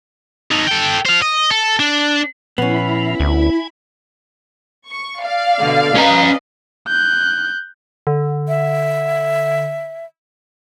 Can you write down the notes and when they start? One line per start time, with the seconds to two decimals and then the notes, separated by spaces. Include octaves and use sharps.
0.51 D#4 A4
0.67 A4 G5
1.05 C5 F5
1.22 D#5
1.50 A4
1.80 D4
2.58 A#2 F3 B3 C#4 E4 B5
3.20 D2 G#5
4.88 C#6
5.21 D5 F5
5.59 B2 D3
5.95 C#4 B4 D#5 A#5
6.88 F#6 G6
8.07 D3
8.48 E5